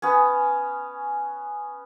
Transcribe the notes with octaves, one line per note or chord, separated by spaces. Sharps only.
B3 C#4